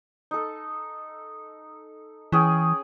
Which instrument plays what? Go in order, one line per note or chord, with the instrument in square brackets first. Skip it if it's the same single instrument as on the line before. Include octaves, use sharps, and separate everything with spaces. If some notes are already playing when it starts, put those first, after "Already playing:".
[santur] D#4 A4
[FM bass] E3 [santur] C#4 G#4 G5